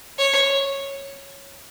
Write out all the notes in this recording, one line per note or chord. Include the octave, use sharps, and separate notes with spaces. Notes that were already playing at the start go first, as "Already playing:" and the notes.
C#5